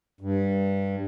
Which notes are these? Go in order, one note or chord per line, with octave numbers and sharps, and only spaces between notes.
G2